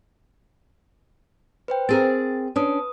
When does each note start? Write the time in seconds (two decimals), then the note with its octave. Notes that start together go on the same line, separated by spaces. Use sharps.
1.68 B4 C5 G5
1.89 C4 G#4 A#4 A6
2.56 C#4 D4 B4 D#6